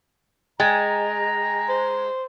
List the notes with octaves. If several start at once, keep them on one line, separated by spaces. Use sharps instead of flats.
G#3 G5 G#5 A#5 A6
C5